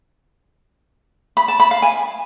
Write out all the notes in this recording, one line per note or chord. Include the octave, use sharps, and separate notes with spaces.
B5
A5
B5
F5
G#5